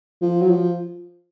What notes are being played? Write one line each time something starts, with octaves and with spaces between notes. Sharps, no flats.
F3
F#3
F3